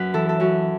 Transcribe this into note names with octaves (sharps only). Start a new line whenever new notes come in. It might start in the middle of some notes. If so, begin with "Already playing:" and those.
Already playing: F#2 B4
E3 A4
A4
F#2 F#4